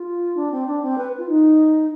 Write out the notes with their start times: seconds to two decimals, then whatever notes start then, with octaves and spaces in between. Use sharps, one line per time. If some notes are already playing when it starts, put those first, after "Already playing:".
Already playing: F4
0.36 D4
0.51 C4
0.67 D4
0.82 C4
0.98 B4
1.18 F4
1.28 D#4